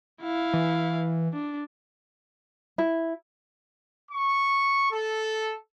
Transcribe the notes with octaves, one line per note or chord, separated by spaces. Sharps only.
E4 F5
E3
D4
E4
C#6
A4